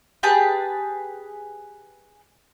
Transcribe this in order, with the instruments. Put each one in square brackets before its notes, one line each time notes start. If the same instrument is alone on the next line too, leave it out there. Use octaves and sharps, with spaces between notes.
[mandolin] G4 G#4 B4 A5